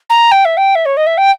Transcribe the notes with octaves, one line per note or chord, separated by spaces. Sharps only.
A#5
G5
E5
G5
E5
C#5
D#5
E5
G5